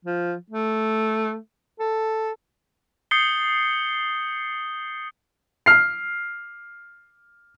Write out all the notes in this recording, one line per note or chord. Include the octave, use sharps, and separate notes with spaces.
F3
A3
A4
D#6 G6 A6 C7 C#7 G7
F6 C7